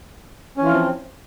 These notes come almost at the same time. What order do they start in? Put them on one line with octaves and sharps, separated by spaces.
C#4 E3 F4 F3 C4